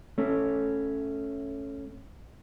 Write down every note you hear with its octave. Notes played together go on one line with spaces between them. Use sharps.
A3 C#4